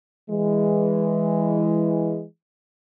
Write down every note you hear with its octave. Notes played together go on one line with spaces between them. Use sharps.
E3 G#3